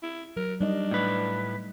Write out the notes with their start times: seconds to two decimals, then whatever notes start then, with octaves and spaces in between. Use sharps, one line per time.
0.03 E4
0.37 F#3 A#4
0.61 G3 D4 D#4 D#5
0.91 A2 B4